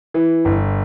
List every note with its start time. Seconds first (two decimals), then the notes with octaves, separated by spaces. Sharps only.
0.14 E3
0.45 G1